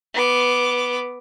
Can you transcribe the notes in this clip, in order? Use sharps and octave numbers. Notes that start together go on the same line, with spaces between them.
B3 D6